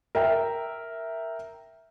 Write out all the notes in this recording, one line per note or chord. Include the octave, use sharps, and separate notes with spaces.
A#4 E5 G5